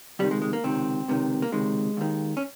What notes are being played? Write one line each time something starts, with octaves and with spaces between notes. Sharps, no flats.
C#2 C3 D#3 G3
G#3
G#3
A#3
C#2 C3 D#3 C4
C#2 C3 D#3
A#3
C#2 C3 D#3 G#3
D#2 D#3
C#4